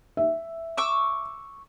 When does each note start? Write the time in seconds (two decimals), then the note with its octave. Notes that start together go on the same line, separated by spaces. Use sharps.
0.17 E5
0.77 C#6 D6 E6